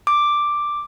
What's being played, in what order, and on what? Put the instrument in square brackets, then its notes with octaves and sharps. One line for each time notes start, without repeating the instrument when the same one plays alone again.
[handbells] D6